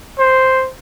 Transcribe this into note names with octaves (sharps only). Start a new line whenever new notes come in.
C5